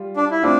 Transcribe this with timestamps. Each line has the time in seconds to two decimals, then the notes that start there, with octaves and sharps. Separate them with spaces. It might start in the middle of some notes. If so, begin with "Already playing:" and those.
Already playing: G3 F4
0.17 D4
0.31 E4
0.43 A3 C4 D4 F4